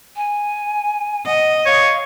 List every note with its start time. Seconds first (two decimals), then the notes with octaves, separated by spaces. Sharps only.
0.16 G#5
1.26 D#5 F#5
1.66 C#5 F5